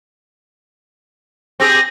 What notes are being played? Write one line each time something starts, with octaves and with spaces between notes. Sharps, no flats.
C4 G4 G#4 A#6